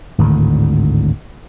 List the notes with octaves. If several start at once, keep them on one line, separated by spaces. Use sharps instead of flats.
G#1 D2 A2 D3